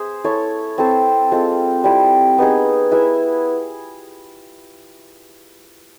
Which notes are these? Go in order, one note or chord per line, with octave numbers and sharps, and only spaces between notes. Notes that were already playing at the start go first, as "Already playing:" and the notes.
Already playing: G#4 C5 E5
E4 A4 C#5
C4 E4 A4 C5
G#3 C4 F4 A4
G3 C4 E4
B3 D#4 G#4
E4 G#4 B4 E5